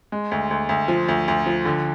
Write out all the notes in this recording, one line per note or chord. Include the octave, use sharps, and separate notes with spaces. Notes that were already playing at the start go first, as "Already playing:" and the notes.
G#3
D2
D2
D2
F3
D2
D2
F3
D3